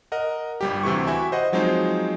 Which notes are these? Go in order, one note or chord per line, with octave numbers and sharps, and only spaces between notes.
A#4 D#5 F#5
G1 G3 G4
D2 C3 E3 C#6
E4 F#4 G4 E5 G#5
C5 D#5 F#5
F3 F#3 G#3 C4 D#4 C5